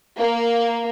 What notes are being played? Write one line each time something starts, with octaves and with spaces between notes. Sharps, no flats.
A#3